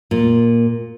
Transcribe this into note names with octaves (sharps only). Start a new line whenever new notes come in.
A#2